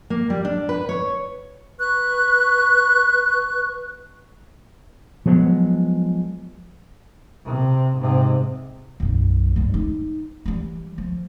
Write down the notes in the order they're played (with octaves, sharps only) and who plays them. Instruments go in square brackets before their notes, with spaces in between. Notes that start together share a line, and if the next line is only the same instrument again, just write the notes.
[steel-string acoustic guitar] A#3
G3
D4
B4
C#5
[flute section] B4 C#6 F#6
[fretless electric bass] F3 F#3 G#3 B3
[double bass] C3
G#2 C3
[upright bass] B1 F#2
G2 C4
D#4
E3 G3
F3